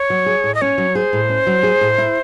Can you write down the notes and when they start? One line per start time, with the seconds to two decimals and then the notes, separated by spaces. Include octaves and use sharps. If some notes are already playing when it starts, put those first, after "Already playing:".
Already playing: C#5
0.10 F#3
0.26 G#4
0.44 A2
0.55 D#5
0.61 C#4 C#5
0.78 F#3
0.95 G#4 C5
1.13 A2
1.29 C#4
1.47 F#3
1.63 G#4
1.81 A2
1.98 E4